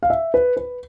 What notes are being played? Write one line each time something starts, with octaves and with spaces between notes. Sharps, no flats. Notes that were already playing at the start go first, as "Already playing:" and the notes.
F5
E5
B4
B4